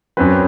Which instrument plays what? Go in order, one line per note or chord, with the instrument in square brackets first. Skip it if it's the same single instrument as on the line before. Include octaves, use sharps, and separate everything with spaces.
[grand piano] F#2 F#3 C4 B4